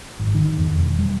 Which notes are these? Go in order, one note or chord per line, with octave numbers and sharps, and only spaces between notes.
G#1
D#3
E2
E1
G3